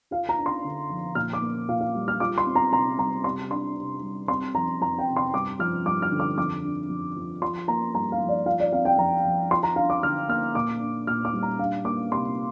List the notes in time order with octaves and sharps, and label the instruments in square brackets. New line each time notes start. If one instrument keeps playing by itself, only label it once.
[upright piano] F4 F5
A#5
D4
C6
D3
F3
A#2 F6
D6
A#3
A#2 F5
F5
G3
F6
F4 D6
C6
C4
A#5
C3 A#5
G3 A#5
C3 C6
D4 C6
C3
G3
C4 C6
F3 A#5
F2 A#5
G5
C3
C6
G2 D6
F3 F6
G2 D6
F6
D3
D6
F2 D6
D4
F2
F3
F4 C6
A#3 A#5
G2 A#5
F5
F3
D5
F4 F5
D5
C4 F5
G5
F2 A#5
F3
F4 C6
A#5
D4 F5
D6
D3 F6
A#3 F6
A#2 D6
D4
A#2 F6
D6
G3
A#5
D4 F5
A#3 D6
C3 C6